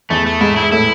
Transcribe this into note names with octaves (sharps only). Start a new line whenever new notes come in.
E2 E3 A3
A3
G#2 G#3 E4
E4
A2 A3 E4